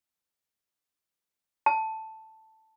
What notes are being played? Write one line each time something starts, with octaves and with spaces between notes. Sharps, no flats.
A5